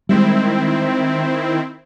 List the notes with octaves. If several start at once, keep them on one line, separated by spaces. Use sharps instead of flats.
D#3 G3 G#3 C4 E4